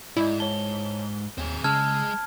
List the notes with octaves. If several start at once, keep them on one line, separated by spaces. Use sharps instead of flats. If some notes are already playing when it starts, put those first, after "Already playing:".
G#2 E4 D5 D#5
C#5 A5 G7
D#2 C4 G#4
C#3 G#3 A5 E6 F6 G#6